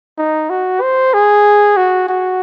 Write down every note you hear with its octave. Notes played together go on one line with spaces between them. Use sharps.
D#4
F#4
C5
G#4
F#4
F#4